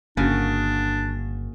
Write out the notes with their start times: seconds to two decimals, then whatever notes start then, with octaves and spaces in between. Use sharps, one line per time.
0.17 G1 C#3 A#3 D4 F#4